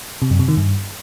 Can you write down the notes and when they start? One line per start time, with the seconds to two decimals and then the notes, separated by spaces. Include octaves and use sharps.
0.22 C3
0.31 F#2
0.39 C3
0.48 D#3
0.57 G2